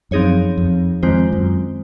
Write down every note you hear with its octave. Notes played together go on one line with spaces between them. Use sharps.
F#2 F3 C4 D#4 G#4 C#5
F2
F2 D#3 G#3 C4 F4 C5
F#2